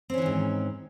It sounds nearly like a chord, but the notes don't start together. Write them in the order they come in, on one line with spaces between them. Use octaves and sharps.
C4 C#4 E3 D#3 G#2